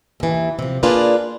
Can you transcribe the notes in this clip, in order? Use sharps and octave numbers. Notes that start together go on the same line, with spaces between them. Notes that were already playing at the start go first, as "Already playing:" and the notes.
D#2 E3
C3 F3
A#3 D4 F4 G#4 B4 D5